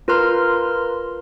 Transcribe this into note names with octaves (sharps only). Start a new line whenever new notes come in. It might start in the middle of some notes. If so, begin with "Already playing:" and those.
F4 A#4 B4 A#5 C6 F6